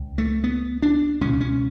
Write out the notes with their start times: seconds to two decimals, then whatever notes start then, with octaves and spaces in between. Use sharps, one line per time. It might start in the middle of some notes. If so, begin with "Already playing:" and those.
Already playing: C#2 C#3
0.18 A3
0.44 B3
0.82 D4
1.21 C#2 B2 C#4
1.41 C#4